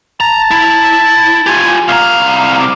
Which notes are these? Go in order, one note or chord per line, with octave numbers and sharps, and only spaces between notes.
A5 A#5
E4
F4 G4 G#5
C2 F5 A#5
D6